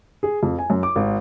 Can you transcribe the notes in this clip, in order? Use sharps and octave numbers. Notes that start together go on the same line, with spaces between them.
G#4
F2
G#5
F#2
D6
G#1